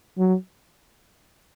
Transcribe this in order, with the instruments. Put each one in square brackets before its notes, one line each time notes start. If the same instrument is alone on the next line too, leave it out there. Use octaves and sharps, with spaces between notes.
[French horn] F#3